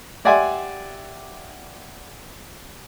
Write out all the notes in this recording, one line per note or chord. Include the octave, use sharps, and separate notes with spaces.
G4 D5 E5 F#5 G#5 C6